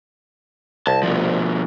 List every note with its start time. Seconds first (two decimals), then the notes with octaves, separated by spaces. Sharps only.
0.87 C2 A5
1.03 B2 F3